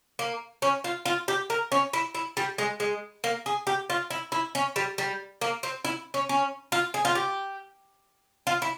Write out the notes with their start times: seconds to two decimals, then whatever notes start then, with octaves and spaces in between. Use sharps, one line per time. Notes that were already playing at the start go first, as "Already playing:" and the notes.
0.19 A#3
0.62 C#4
0.84 F4
1.06 F4
1.28 G4
1.50 A#4
1.72 C#4
1.93 E4
2.15 E4
2.37 G3
2.58 G#3
2.80 G#3
3.24 A#3
3.46 G#4
3.67 G4
3.90 F4
4.10 E4
4.32 E4
4.55 C#4
4.76 G3
4.98 G3
5.41 A#3
5.63 C4
5.85 E4
6.14 C#4
6.29 C#4
6.72 F4
6.94 G#4
7.05 F4
7.15 G4
8.47 F4
8.62 E4